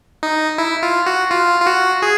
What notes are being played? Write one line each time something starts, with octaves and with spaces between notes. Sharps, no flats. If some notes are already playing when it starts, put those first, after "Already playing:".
D#4
E4
F4
F#4
F4
F4
F#4
G#4